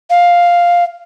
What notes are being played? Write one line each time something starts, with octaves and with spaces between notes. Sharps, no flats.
F5